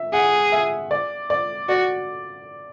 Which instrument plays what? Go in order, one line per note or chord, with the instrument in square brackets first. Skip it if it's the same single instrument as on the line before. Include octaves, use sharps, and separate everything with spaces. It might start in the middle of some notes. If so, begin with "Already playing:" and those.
Already playing: [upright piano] E5
[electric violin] G#4 [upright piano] F#5
[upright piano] E5
D5
D5
[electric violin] F#4 [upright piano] D5